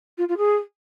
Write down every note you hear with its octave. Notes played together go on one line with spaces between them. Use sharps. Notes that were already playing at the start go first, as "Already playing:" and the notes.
F4
F4
G#4